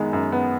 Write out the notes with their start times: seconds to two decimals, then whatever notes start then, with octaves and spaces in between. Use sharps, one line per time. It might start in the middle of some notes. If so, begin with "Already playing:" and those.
Already playing: F#2 D#3 G#3 B3
0.13 F#2
0.32 B3